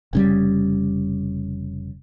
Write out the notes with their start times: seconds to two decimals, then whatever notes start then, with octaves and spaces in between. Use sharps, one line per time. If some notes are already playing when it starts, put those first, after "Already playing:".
0.13 F1 C#3 G3